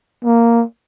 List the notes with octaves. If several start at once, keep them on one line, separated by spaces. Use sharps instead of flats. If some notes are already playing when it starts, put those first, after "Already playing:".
A#3